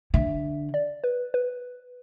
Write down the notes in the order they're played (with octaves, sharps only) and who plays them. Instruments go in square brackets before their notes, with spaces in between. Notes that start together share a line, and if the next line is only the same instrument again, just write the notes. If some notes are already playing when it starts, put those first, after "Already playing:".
[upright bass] D3 [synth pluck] E5
[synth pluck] D5
B4
B4